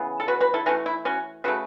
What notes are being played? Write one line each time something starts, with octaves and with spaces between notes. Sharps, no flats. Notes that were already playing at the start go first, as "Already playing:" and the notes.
Already playing: C#3 E3 B3
A4
F#4 B4
F#4 B4
E4 A4
E3 A3 C#4 F#4
E4
C#4 F#4
C#3 A3 F#4 B4